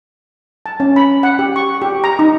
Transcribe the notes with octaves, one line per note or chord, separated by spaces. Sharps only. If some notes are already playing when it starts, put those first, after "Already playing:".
A5
C#4
B5
F#5
G4
C#6
G4
A#5
D#4